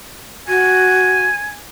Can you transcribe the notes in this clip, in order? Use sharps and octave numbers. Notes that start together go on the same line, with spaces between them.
F#4 G#5